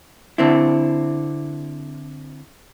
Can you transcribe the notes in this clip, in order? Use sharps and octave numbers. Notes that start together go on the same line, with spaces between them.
D3 C4 E4